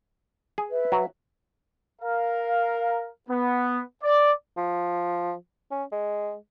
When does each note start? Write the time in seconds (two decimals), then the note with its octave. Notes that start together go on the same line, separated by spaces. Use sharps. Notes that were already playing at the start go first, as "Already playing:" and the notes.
0.58 G#4
0.71 B4 E5
0.92 F#3
2.02 A#4 F5
3.29 B3
4.04 D5
4.57 F3
5.71 C#4
5.92 G#3